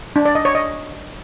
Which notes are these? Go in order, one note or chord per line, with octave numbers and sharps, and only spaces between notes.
D4
D5
D#5
C#5
D#5